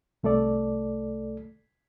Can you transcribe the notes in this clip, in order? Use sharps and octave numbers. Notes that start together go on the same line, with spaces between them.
C2 A3 A4 D5